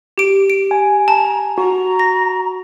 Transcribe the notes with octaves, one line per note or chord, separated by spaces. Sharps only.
G4 D7
D7
G#5
A5 A#5
F#4 A#5
A#6